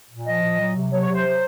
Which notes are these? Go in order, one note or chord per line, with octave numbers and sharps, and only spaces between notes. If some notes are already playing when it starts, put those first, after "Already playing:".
A#2
F3 D#5
A#2
F#3
C3
F#3 C#5
C#5
C3
C5
F#3